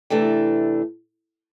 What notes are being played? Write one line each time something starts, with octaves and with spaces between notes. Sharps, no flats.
C3 E3 A3 D4